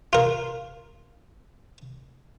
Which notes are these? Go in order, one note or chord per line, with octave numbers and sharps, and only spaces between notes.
F4 A#4